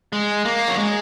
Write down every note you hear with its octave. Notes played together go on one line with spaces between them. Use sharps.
G#3
A#3
F#3
G#3